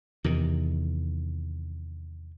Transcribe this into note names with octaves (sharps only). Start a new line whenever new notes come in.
E2 C3 D#3